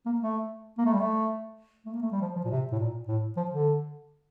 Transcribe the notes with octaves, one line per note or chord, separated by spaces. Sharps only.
A#3
A3
A#3
A3
G3
A3
A3
A#3
A3
G3
F3
F3
A#2
C3
A2
A#2
A2
F3
D3